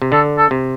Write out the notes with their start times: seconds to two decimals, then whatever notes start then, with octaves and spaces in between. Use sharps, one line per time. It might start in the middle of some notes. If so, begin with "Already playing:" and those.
0.02 C3
0.12 D3 A4
0.38 A4
0.51 C3